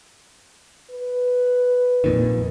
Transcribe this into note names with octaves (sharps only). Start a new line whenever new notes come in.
B4
F2 A#2 D#3